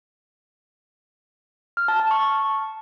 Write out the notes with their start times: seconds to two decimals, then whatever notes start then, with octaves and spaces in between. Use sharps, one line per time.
1.77 F6
1.88 A5
2.00 A5
2.11 C#6